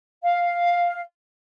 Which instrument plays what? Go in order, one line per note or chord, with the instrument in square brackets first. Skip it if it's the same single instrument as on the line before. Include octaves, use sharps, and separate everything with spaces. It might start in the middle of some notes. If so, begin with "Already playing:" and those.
[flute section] F5